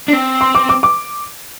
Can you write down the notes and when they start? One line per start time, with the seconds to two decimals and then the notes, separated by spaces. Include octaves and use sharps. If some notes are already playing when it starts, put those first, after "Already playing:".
0.08 D4
0.13 C4
0.41 C6
0.55 D6
0.69 D6
0.83 D6